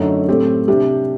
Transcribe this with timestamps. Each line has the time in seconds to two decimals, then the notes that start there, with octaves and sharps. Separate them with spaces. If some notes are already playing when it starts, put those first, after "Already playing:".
Already playing: F#2 D3 A3 D#4
0.28 A2 A3 C4 G4
0.68 C3 G3 D4 G4